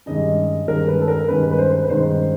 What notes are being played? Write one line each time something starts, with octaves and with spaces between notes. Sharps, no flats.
G2 D#3 G#3 C#4 D#5
G2 D#3 G#3 C#4 A#4
B4
A4
A#4
G2 D#3 G#3 C#4 B4
B4
C5
B4
G2 D#3 G#3 C#4 C5